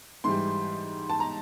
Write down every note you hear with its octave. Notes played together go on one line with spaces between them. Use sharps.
G#2 E3 G3 C6
A5
A#5